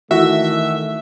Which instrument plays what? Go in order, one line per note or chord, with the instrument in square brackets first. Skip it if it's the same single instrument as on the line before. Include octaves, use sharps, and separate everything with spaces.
[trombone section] D#3 A3 [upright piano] E3 F#4 [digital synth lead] E5